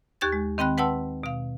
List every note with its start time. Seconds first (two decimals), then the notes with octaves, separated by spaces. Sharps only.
0.21 D#2 G4 C#6 F#6 G#6 A6
0.32 G#3
0.58 D#3 C4 G5 B5 F#6
0.78 B4 F#5 G5 A5 C6 E6
1.23 B2 F5